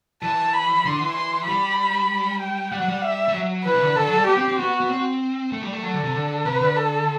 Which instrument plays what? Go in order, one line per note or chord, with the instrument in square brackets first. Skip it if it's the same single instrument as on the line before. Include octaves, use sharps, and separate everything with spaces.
[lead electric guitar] E3 [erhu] A5
[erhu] B5
[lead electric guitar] D3 [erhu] C6
[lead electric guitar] E3
[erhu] C6
[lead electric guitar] G3 [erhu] B5
[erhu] G5
[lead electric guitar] G3 [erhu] F#5
[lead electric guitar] F#3
G3
[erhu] E5
[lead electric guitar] G3
F#3
[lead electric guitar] E3 [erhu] B4
[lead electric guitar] C3
D3
[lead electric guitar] D3 [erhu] A4
[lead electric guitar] F#3
G3
[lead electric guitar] B3 [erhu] G4
[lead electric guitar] C4
C4
[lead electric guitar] B3 [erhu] F#4
[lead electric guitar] B3
C4
A3
G3
A3
[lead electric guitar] F#3 [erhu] A4
[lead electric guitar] D3
C3
D3
[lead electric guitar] C3 [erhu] B4
[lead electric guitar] D3
[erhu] A4